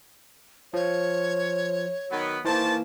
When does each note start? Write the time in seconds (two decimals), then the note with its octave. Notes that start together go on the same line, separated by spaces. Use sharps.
0.73 F3 C#5
2.11 D#3 F#3 B3
2.45 D#3 E3 A#3 C5 A5